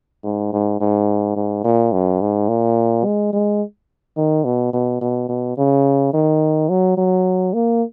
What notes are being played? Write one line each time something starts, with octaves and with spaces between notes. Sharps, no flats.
G#2
G#2
G#2
G#2
A#2
F#2
G#2
A#2
G#3
G#3
D#3
B2
B2
B2
B2
C#3
D#3
F#3
F#3
A#3